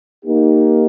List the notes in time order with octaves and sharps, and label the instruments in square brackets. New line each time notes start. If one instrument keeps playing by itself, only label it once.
[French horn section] A#3 D#4 G4